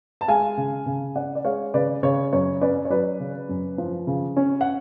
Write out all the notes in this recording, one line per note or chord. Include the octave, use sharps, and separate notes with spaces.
A5
G#3 F5 G#5
C#3
C#3
C#4 D5 F#5
D5
G#3 C#5 F5
C#3 B4 D5
C#3 C#5
F#2 C#5
C#4 B4 D5
C#5
F#3 B4 D5
C#3
F#2
F3
C#3
C#4
F#5